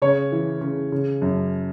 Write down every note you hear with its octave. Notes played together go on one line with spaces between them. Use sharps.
C#3 C#5
E3
C#3
C#3
F#2